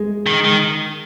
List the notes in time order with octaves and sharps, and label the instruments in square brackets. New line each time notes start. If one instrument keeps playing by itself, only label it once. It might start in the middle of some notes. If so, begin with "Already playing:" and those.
Already playing: [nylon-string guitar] G#3
[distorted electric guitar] D#3
D#3